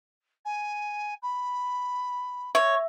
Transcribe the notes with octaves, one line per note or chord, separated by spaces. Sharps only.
G#5
B5
C#5 E5